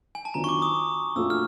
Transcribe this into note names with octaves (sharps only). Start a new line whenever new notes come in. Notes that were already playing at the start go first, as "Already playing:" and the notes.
G#5
A5
D#3 F#3 B3 D4 F4 A#5
C#6
D6
D#6
A#2 F3 A3 D4 F#4 E6
F6